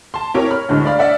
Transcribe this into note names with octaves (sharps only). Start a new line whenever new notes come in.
A5 C6
C4 E4 G4 A#4 C#5
C#5 B5 F6
D2 A2 D3 G#3
D5 F5 B5 F6
D4 D5 E5 F#5